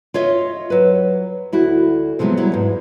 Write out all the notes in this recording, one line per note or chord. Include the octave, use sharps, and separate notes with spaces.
F4 C#5 D#5 E5
F#3 B4
D2 E4 F#4
C3 F3 F#3 G#3 B3
F#3 G3 E4
E2 G#2